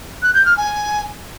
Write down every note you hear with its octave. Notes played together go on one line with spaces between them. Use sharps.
F#6
G6
F6
G#5